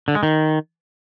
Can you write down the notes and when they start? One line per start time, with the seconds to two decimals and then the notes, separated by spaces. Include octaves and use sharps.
0.08 D3
0.15 G#3
0.23 D#3